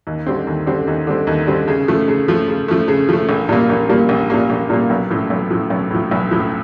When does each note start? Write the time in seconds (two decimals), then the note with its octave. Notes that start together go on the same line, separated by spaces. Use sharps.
0.07 D#2
0.26 D3 G3 C4
0.47 D#2
0.66 D3 G3 C4
0.87 D#2
1.07 D3 G3 C4
1.27 D#2
1.47 D3 G3 C4
1.68 C#3
1.88 F3 A3
2.08 C#3
2.28 F3 A3
2.48 C#3
2.68 F3 A3
2.88 C#3
3.09 F3 A3
3.29 A#1
3.49 A#2 G3 A#3
3.70 A#1
3.89 A#2 G3 A#3
4.09 A#1
4.30 A#2 G3 A#3
4.50 A#1
4.70 A#2 G3 A#3
4.90 B1
5.10 A2 F3
5.30 B1
5.50 A2 F3
5.70 B1
5.91 A2 F3
6.11 B1
6.31 A2 F3